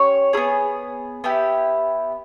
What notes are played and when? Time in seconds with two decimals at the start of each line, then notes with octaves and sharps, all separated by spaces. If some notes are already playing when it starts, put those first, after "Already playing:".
Already playing: C#4 G4 C#5
0.33 E4 G#4
0.37 B3
1.24 B3 E4 G4